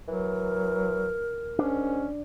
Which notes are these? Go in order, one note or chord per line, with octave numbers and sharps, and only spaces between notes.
E3 F#3 A#4
G#2 C#4 D4